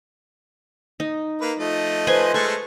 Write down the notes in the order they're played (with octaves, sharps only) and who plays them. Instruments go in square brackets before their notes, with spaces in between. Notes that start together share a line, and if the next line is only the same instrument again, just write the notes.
[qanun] D#4
[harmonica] A#3 B4
F3 A3 D#5
[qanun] B4 C5 G#5
[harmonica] G#3 A3 A4 [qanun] C#6